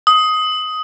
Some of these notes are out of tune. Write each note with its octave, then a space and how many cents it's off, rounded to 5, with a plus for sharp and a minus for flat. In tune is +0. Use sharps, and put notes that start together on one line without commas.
D#6 +10